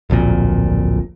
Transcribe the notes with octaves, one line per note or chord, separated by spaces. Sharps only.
D1 A#1 F2 A#2